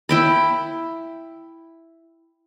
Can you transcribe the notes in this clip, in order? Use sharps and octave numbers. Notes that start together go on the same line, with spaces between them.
E4 G5 B5